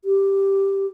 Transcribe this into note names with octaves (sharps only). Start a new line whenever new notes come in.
G4